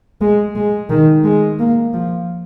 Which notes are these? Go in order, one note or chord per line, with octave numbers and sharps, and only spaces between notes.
G#3
G#3
D#3
G#3
A#3
F3